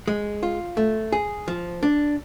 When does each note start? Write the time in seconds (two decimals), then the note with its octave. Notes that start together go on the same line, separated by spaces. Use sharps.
0.08 G#3
0.43 F4
0.77 A3
1.12 G#4
1.48 F3
1.83 D4